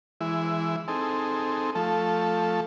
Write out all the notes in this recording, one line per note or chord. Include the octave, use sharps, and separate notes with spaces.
E3 G#3 E4
C4 D#4 G#4 A4
F3 A3 A4